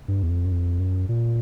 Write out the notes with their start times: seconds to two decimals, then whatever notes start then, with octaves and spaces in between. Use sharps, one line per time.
0.08 G2
0.23 E2
0.30 F2
0.45 F#2
0.52 F2
0.79 F#2
1.09 A#2